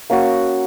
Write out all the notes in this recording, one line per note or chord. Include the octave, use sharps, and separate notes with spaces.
A#3 C#4 F#4